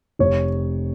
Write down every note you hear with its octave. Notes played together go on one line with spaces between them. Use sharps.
F1 C#5